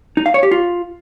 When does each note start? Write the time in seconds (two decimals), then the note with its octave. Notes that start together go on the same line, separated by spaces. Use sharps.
0.17 D#4
0.26 F5
0.34 C#5
0.43 G4
0.51 F4